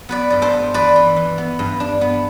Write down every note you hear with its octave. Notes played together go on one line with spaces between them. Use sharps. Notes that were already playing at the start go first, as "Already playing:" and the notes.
B3 B4 D5
G2 D5
A4 C5
B3
E3 B4 D5
E3
E3
B3
G2
D4
B3